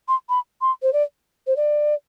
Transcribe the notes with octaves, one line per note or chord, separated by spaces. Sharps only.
C6
B5
C6
C5
D5
C5
D5